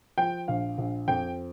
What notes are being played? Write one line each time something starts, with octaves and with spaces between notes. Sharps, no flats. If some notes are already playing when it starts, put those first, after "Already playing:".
F3 G5
A#1 F5
A#1
F2 G5